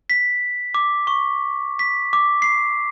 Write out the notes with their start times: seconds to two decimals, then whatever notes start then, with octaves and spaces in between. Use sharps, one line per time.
0.10 B6
0.75 D6
1.07 C#6
1.79 B6
2.13 D6
2.42 C7